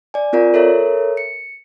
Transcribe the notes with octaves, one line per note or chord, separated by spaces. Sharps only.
D5 G#5
C4 F4 A#4 D5
A4 A#4 C#5 E5 A#5
C#7